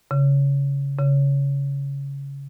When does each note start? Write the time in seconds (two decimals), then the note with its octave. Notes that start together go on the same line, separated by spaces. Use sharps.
0.11 C#3
0.99 C#3